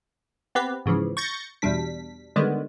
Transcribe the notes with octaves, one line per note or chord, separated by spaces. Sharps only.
B3 C4 G4 B4
G#2 C#3 E3 F3
C#6 G6 A6 A#6 C#7
E2 B2 G3 D4 B6
D3 D#3 G3 G#3 B3